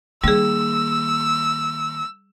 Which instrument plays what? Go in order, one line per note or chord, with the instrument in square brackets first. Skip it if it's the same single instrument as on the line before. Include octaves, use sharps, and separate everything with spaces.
[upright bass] D#3 A#3 [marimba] G3 G#4 [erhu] E6